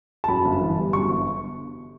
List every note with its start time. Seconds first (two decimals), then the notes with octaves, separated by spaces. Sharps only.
0.24 A5
0.28 F#2 B5
0.45 G1
0.61 E3
0.77 G3
0.93 F#2 C#6
1.09 G1